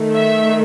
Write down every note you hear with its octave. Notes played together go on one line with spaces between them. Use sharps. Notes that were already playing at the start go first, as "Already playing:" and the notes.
Already playing: D#3 A3
E5